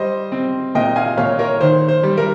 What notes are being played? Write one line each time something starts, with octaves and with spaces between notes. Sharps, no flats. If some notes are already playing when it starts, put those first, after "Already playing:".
Already playing: G3 C5 D#5
C4
A#2 D#5 G5
F5 G#5
A#2 C#5 F5
A#4 C#5
D#3 C5
C5
G3
A#4